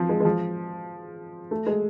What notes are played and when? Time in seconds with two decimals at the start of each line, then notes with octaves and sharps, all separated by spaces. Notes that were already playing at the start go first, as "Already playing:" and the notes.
Already playing: F3 C4
0.09 G#3
0.20 G#3
0.25 F3
1.51 A3
1.66 G#3